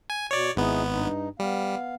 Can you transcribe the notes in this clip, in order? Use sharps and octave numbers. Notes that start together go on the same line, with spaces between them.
G#5
B2 C#5 D5
G#1 B3 D#4 E4 G#4
G2 D#4
G3 B3 F5